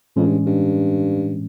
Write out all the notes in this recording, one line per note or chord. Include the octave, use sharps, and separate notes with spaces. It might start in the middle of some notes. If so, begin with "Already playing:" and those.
F2 A2 E3 G#3 C#4
G2
G2